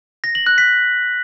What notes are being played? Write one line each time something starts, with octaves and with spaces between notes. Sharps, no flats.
A#6
F#7
F#6
B6